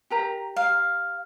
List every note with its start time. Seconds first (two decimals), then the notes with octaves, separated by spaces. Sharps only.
0.10 G4 A#4 A#5
0.56 F5